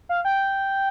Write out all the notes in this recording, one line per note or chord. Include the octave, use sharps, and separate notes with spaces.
F5
G5